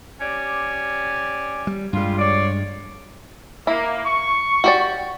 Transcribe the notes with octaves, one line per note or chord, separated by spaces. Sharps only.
C#4 G4 D5
G3
G2 G3 G#3 F4
F4 C#5 D5
A#3 E4
C#6
F#4 G4 D5